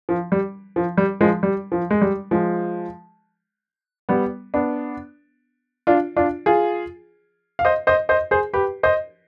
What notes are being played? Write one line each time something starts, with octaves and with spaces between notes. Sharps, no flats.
F3
G3
F3
G3
F3 G#3
G3
F3
G#3
G3
F3 G#3
G3 B3
B3 D4
D4 F4
D4 F4
F4 G#4
F5
C5 D#5
C5 D#5
C5 D#5
G#4 C5
G4 B4
C5 D#5